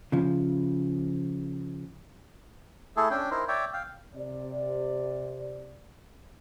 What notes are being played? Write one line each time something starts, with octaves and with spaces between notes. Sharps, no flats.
C#3 F3
A3 E4 G#4 A4
C#4 D4 G5
D#4 E4 A#4 C5
C#5 D5 E5 G5
F5 G5
C3 D5